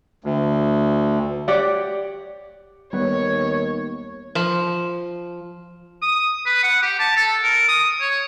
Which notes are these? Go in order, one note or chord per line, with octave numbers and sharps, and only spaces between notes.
D2
G4 C#5 D5 F#5
D#2 G3 B3 C#5
F3
D#6
B4
F#5
G4
A5
A4
A#4
D#6
C#5